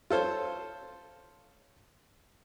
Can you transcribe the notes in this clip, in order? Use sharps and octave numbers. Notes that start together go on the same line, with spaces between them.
F4 A4 C5 C#5